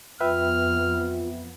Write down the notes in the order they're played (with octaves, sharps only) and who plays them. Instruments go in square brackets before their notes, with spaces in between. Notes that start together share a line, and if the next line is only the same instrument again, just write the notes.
[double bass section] F2 F3 B3 [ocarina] F4 [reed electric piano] B4 E5 G5 [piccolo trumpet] F6